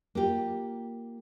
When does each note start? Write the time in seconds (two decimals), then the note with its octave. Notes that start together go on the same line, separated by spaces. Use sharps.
0.15 A#3 F4 G4